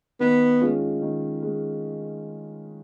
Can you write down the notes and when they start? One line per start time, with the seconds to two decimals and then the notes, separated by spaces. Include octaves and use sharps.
0.20 D#3 B3
0.61 G#3 C#4 F4
1.02 D#3
1.42 G#3